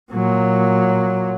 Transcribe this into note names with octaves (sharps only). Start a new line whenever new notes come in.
A#2 F#3